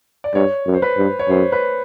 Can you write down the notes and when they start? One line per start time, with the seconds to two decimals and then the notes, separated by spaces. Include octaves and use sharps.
0.24 D5
0.35 G2 C#5
0.67 F#2
0.74 C5
0.82 B4
0.97 G2
1.19 C#5
1.29 F#2 C5
1.52 B4